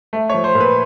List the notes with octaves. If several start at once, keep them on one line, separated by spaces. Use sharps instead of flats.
A3
F3 C#5
C5
A#2
B4